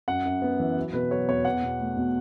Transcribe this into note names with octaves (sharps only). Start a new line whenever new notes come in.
F#2 F#5
F#2
B3
E3
F#3
B2 B4
F#3 C#5
E2 C#5
E2 F#5
B2
A3
B2